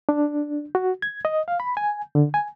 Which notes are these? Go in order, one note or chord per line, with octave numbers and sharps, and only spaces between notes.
D4
F#4
G#6
D#5
F5
B5
G#5
D3
G#5